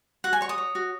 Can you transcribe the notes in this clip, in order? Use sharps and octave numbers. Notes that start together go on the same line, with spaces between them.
F#4 F#5
G#5
C#5 C#6
D#6
C#5
F#4